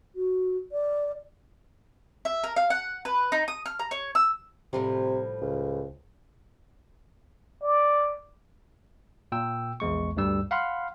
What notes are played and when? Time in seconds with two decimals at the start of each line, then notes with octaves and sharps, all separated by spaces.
0.15 F#4
0.72 D5
2.25 E5
2.44 A#4
2.56 F5
2.70 F#5
3.05 B4
3.32 D#4
3.48 D#6
3.66 F6
3.79 A#5
3.91 C#5
4.15 E6
4.73 A2 C3 F3 G3
5.41 C#2
7.62 D5
9.32 A#2 G5 E6
9.80 A#1 E2 G#3 C#6
10.17 D2 G2 G3 E6
10.51 F5 F#5 B5 C6 F6